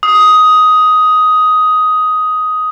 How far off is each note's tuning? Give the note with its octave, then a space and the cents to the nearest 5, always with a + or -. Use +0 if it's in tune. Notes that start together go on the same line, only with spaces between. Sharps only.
D#6 +10